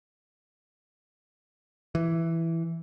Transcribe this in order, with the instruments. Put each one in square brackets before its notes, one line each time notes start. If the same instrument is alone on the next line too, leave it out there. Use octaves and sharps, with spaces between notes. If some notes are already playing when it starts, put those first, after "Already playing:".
[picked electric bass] E3